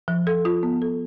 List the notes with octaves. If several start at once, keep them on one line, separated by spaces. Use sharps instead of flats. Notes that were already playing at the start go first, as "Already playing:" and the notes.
F3
A4
F4
B3
A4